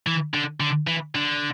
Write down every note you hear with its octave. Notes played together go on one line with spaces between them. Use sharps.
E3
D3
D3
E3
D3